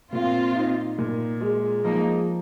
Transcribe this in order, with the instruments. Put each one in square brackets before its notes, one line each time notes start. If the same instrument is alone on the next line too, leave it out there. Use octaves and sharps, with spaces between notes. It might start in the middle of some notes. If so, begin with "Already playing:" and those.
[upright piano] A#2 [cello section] C4 F4
[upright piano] D#4
A#2
G#3
[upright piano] F3 [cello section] A#3 D#4